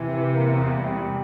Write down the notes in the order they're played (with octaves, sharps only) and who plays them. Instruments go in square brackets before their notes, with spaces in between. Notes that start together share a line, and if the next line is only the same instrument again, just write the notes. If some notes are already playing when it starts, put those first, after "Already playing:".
Already playing: [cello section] C3 [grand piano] E3
[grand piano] E3
A#3
E2
G3
G3